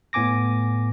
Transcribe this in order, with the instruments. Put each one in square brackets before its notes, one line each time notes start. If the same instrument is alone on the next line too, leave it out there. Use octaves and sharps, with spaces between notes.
[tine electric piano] A2 B3 G#5 D6 A#6